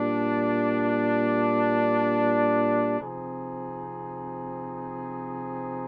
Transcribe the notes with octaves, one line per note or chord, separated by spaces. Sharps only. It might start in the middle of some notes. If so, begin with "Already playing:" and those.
Already playing: A#2 G3 D4
C3 F3 C4 D#4 G#4